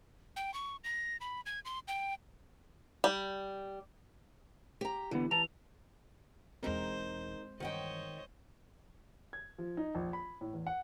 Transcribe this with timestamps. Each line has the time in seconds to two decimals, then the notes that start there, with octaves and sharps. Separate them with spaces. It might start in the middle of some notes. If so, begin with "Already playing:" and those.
0.36 G5
0.54 C#6
0.84 A#6
1.21 B5
1.46 G#6
1.65 C6
1.88 G5
3.04 G3
4.81 G4 A#5
5.11 A2 D3 E3 B3
5.31 E3 A5 A#5 F7
6.63 E1 E2 G#3 C4 D#4 A#4 C5
7.60 G2 D#3 E3 C5 C#5 D#5 F#5 G5
9.33 G#6
9.58 F3
9.77 D#4
9.95 A#1
10.13 B5
10.41 A2
10.53 E2
10.67 F#5